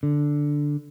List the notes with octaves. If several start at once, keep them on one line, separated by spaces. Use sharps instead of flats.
D3